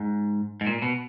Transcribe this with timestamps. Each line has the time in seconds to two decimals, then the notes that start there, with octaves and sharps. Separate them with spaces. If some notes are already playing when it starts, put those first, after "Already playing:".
Already playing: G#2
0.61 G#2
0.67 A#2
0.82 B2